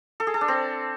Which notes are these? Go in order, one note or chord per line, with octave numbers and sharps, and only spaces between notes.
A4
G#4
A4
D4
C4